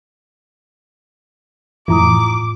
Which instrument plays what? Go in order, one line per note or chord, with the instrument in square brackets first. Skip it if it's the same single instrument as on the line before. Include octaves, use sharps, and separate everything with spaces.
[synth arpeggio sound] F2 E3 [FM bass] A2 [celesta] F4 A#5 D#6 [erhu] D6